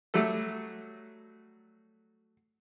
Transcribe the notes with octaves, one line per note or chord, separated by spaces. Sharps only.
F#3 G3 A3 A4